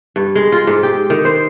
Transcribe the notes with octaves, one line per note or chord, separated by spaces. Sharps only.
G2
G#3
F4
G#2
G4
D#3
C5